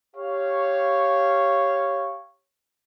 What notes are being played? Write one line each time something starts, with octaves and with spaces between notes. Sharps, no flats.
G4 C#5 F5